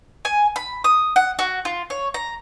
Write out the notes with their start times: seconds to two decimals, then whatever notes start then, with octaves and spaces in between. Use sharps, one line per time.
0.25 G#5
0.56 B5
0.84 D#6
1.16 F#5
1.39 F#4
1.65 F4
1.90 C#5
2.14 A#5